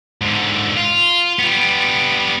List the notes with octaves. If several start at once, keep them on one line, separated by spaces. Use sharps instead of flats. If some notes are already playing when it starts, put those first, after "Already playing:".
G#2 D3
F4
G3 B3